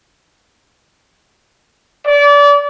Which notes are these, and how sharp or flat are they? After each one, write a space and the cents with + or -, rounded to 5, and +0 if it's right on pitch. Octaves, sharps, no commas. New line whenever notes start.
D5 -30